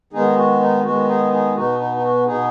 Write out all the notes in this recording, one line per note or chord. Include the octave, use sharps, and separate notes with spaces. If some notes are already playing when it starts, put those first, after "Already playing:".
D#3 G#3 B3 D#4 G#4
F#4
D#4
D#3 G#3 B3 F#4
D#4 G#4
D#4 G#4
B2 B3 D#4 F#4
D#4
D#4
F#4
B2 B3 D#4 G#4